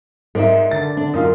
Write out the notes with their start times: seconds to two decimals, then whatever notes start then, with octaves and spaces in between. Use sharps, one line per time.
0.35 G#2 A#4 D5 E5
0.71 D3 A6
0.97 D4
1.14 F#2 D#4 F4 A#4